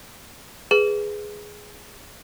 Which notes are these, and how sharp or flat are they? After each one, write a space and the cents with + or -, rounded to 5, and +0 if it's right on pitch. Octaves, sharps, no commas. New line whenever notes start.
G#4 +0 B4 +0